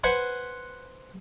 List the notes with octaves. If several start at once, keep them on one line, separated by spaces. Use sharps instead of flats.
B4 C5 F#5 G#5